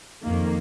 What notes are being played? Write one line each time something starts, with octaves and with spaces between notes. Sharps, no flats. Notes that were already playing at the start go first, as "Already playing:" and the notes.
F2 D#3 A#3